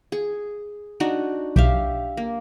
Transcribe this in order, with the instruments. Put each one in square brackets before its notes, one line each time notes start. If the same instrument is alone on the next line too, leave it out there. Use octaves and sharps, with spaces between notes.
[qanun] G#4
D4 D#4 F#4
[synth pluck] B1 [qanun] G4 E5 F5
[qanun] A#3